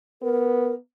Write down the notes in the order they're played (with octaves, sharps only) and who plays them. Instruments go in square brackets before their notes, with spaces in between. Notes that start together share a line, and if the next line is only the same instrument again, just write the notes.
[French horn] B3 [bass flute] A#4